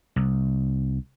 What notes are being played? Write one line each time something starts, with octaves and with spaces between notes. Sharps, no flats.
C2